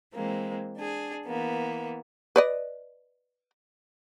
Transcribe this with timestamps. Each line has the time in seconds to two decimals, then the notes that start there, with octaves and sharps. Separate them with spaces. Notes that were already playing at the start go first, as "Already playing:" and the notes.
0.14 E3 G#3 A#3 C4
0.76 D4 G#4
1.25 E3 A#3 B3
2.36 B4 D5 D#5